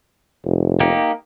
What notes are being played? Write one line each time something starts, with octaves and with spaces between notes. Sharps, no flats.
F1
A#3 D#4 G4